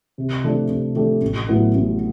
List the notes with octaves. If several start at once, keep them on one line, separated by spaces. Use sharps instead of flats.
C3
F3 A3 D4 G4
C3
F3 A3 D4 G4
A1
A2 F#3 B3 E4
A1